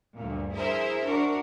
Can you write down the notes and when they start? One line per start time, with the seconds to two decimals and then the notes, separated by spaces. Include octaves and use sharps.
0.17 D2 G2 A#2
0.52 E4 G#4 A#4 C5 E5
1.05 D4 F#4 A#4